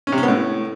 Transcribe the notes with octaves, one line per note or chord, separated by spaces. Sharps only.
C#4
C3
C#4
B3
A2